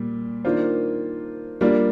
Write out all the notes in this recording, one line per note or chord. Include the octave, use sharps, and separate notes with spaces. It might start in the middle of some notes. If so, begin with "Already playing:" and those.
Already playing: A#2 G3
D#3 A#3 D4 F4 C5
G3 A#3 D4 F4